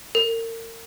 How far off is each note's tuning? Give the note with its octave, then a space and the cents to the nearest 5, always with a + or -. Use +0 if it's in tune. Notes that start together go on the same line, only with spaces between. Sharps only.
A#4 -35